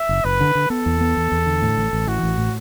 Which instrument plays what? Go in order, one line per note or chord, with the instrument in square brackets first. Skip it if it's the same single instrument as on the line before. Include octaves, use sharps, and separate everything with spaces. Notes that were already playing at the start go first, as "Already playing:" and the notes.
Already playing: [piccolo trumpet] E5
[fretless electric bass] F#1
[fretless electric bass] F#1 [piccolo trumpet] B4
[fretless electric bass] D3
D3
[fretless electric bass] B3 [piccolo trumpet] A4
[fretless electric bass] E2
B3
E2
E2
D3
A2
A1
A1
[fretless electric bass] E3 [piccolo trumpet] F#4
[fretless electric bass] A1
A2